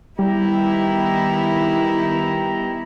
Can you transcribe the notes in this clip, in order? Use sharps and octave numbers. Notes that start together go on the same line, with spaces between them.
D#3 G3 B3 E4 G4 A#5